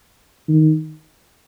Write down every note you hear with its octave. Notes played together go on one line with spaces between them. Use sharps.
D#3